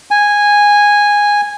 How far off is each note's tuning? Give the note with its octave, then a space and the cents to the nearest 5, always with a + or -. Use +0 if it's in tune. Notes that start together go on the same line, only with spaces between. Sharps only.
G#5 -10